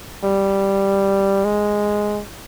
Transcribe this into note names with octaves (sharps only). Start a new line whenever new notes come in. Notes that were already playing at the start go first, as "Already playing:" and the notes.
G3
G#3